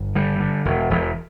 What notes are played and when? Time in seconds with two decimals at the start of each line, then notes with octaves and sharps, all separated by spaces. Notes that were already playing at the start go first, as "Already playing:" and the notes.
Already playing: G1
0.15 D3 G3
0.40 D3
0.65 E1
0.90 E1